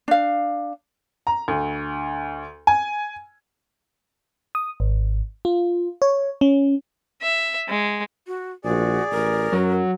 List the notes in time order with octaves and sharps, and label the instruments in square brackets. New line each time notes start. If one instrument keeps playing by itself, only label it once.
[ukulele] D4 F5
[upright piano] A#5
D2
G#5
[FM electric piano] D#6
G#1
F4
C#5
C#4
[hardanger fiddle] E5
G#3
[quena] F#4
[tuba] A#1 [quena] F#4 [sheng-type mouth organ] G#4 D5
[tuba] A1 [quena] A#4
[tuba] F#2 [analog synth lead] F#3